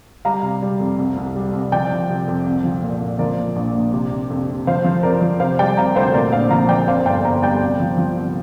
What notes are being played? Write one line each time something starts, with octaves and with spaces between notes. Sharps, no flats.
G3 F5 A#5
C3
G3
F2
C2
C2
G3
C2
F3 D5 G5
F3
C3
F2
C2
F3
A#2
A#2
F3 A#4 D5
A#2
A#1
A#1
C3
C3
F2
C3
F3 C5 F5
F3
F2 A#4 D5
F3
C3 C5 F5
G3 D5 G5
C3 F5 A#5
D2 C5 F5
A#2 A#4 D5
A#1 C5 F5
F3 F5 A#5
F3 D5 G5
F2 C5 F5
G1 D5 G5
G1 F5 A#5
G3 D5 G5
C2
F3
F3
C2